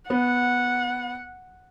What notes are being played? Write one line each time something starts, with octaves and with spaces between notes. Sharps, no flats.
B3 F#5